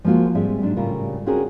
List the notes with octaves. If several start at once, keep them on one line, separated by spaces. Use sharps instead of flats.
F3 G#3 A#3 F4 F#4
G#2 G3 G#3 C4 G#4 E5
G#2 F#3 D4
A2 C#3 G3 F4 A#4
C4 C#4 F4 F#4 G#4 A#4